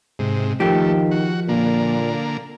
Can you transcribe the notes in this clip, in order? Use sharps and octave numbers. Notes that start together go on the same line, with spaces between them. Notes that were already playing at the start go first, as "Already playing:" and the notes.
G#2 C3
D#3 F3 A3 G4
F#4
A#2 D3 A#3